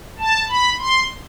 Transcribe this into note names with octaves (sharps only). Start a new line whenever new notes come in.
A5
B5
C6